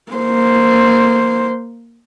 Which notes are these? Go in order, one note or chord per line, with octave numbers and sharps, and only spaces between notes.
A#3 C5